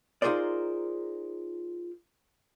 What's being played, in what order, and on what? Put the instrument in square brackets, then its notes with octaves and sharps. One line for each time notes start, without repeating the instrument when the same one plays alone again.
[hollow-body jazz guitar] D#4 F4 G#4 A#4 C5 D5